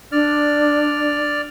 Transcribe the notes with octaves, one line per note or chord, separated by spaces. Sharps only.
D4 D5 F6